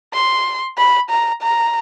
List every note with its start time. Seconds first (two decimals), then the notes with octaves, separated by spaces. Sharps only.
0.13 C6
0.77 B5
1.10 A#5
1.42 A#5